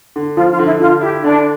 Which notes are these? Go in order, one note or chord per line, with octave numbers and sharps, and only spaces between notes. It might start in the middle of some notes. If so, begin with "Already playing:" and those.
D3
F3 F4
F4
D3
E4
D3 F4
E4 G4
D3 D4